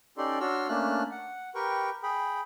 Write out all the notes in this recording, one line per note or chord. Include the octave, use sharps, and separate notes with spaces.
C#4 D#4 G4 A4 D5 C6
D4 F#4 C#5 C6 E6 F6
A3 A#3 C#4 D4 F6 F#6
F#5
G4 A#4 B4 G5 C#6
G#4 G5 B5